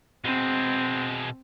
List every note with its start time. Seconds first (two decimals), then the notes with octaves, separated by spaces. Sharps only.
0.24 B2 G#3 C4